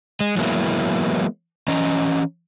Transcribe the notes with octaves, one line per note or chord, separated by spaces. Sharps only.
G#3
E3 F#3 G#3 A#3 B3 E4
E3 C#4 D#5 A#5